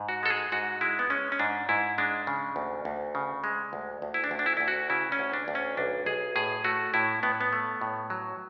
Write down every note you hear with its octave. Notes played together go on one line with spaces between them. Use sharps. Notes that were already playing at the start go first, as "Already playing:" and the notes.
Already playing: G#2
F#4
G#3 A4
G#4
G#2 F#4
G#3 E4
B3
G#3 C#4
C#4
G#2 D4
G#2 E4
G#3 D4
C#3
D2
D2
C#3
G#3
D2
D2
E4
D4
D2
D4
E4
D2 E4
F#4
C#3 E4
C#4
D2
D4
D2
C#4
B1 D4
B1 G#4
A2 G#4
A3 F#4
A2 E4
A2 B3
B3
A3
A2
F#3